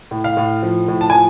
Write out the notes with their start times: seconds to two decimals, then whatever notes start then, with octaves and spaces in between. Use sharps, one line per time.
0.11 A2
0.24 F5
0.37 A2
0.63 F3
0.88 A2
1.01 A5
1.10 F3 G#5